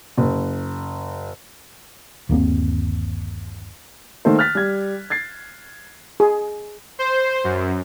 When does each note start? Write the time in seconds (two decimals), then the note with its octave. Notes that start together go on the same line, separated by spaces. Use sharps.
0.17 F#1
2.29 G1 D#2 A#3 C4
4.25 D#3 A3 A#3 A4 C5
4.39 F6 F#6 A6 B6
4.55 G3 G#6
5.10 G#6 A6 C7
6.20 G#4
6.99 C5
7.44 F#2